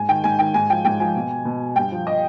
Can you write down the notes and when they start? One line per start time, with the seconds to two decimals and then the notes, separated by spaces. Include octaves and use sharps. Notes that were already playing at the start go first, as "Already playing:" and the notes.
Already playing: G#2 G#5
0.09 D#3 G5
0.24 G#2 G#5
0.39 D#3 G5
0.54 G#2 G#5
0.70 F3 G5
0.85 G#2 G5
1.00 F3 G#5
1.15 B2
1.45 B2
1.76 G2 G5
1.92 F3
2.07 D#5